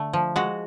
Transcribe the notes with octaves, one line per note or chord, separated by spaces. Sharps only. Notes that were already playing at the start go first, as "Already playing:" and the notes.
Already playing: D3 A3
F3
G#3 F#4